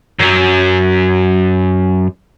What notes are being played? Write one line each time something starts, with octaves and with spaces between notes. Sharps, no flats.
F#2 F#3